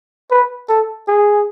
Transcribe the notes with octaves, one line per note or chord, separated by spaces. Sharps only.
B4
A4
G#4